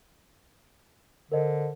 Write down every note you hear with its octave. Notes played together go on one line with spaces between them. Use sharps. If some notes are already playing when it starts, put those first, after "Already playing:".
D3 A#4 C5 D#5